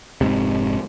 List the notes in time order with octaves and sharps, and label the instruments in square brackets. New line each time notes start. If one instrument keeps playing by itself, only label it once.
[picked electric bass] F1 A#1 G#2 C3